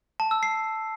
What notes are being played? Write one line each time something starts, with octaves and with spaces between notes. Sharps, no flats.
A5
E6
C7